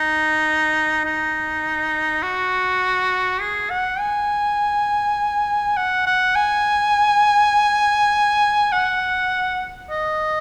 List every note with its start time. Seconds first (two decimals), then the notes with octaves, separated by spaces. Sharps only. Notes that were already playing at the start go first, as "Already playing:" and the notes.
Already playing: D#4
1.05 D#4
2.23 F#4
3.41 G#4
3.70 F#5
3.99 G#5
5.77 F#5
6.06 F#5
6.36 G#5
8.72 F#5
9.91 D#5